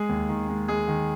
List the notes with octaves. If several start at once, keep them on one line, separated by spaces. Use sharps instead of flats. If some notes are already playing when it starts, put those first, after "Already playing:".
Already playing: G#3 G#4
D#2
D#3
G#3
G#3 G#4
D#3